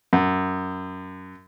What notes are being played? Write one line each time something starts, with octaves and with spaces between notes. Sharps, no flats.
F#2